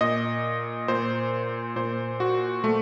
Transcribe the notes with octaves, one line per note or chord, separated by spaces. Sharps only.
A#2 D#5
A#2 C5
A#2 C5
F#4
A#2 A3